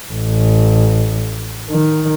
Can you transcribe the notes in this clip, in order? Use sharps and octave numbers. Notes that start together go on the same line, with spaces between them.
A1
D#3